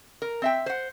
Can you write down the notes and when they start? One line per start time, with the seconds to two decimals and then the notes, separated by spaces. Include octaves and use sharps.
0.22 A#4
0.42 C4 E5 G5
0.66 C5 F#5